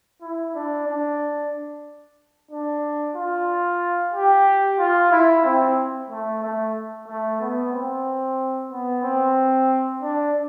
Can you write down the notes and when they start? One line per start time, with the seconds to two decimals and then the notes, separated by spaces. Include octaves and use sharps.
0.22 E4
0.55 D4
0.88 D4
2.51 D4
3.16 F4
4.14 G4
4.79 F4
5.12 E4
5.45 C4
6.10 A3
6.43 A3
7.08 A3
7.41 B3
7.73 C4
8.71 B3
9.04 C4
10.03 D4